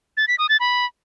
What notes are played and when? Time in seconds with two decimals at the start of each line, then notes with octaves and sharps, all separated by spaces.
0.17 A6
0.28 B6
0.39 D#6
0.49 A6
0.60 B5